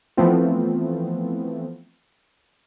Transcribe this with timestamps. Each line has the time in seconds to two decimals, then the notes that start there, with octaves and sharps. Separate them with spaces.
0.17 E3 F3 A3 B3 C4 F4